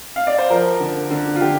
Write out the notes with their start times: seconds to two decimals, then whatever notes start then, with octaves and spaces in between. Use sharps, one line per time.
0.16 F5
0.27 D5
0.38 C5
0.50 F3 A#4
0.80 D3
1.10 D3
1.35 F4
1.41 D3 G4